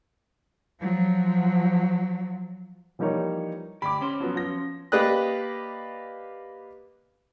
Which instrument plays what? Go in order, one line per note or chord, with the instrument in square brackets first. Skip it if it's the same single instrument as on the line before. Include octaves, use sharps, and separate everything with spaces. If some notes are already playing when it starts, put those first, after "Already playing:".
[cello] F3 F#3
[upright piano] E3 F3 G3 A#3 D#4 C#5
[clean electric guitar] D2 G4 [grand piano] B5 D6
[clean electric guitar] C#4 C5
[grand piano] F3 F#3 B3
F3 A#6
[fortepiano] A#3 G4 B4 D5 D#5 F#6